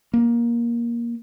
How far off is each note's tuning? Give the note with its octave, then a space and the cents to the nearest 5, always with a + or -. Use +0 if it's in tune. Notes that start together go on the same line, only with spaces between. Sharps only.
A#3 +15